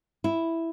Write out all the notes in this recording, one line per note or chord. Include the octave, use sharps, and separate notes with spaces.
E4